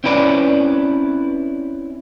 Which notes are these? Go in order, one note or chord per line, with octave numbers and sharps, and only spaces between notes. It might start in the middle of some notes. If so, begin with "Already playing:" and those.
C4 C#4 E4 B4 D5